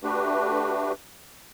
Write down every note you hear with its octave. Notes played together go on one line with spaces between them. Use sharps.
A3 D4 F#4 G4 B4